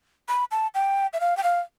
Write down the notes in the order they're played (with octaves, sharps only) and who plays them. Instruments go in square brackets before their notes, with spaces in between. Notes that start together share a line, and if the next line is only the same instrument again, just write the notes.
[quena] B5
A5
G5
E5
F5
G5
F5